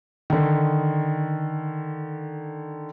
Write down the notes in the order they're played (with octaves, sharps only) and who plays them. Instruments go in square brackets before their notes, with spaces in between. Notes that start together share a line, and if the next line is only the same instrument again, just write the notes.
[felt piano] D3 D#3